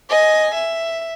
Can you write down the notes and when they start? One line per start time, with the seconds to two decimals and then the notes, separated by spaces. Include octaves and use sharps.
0.10 D#5 G#5
0.55 E5